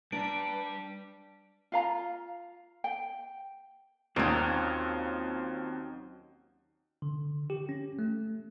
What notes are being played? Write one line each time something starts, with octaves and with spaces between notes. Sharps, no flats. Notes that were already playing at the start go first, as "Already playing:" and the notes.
G3 D4 B4 D5 A#5 D7
F4 F5 A#5
G5
D#2 D#3 F#3 C4 C#4 F4 D5
D3
G4
C#4
A3